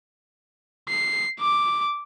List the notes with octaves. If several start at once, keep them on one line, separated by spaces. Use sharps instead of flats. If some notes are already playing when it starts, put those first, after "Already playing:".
C7
D6